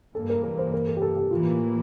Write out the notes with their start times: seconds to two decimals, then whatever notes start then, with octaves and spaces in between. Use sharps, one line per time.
0.14 G2 E3 A#3 A4
0.30 A#4
0.44 A#4
0.58 C5
0.73 A#4
0.87 A4
0.97 G4
1.02 A4
1.16 G4
1.31 A2 E3 A#3 F4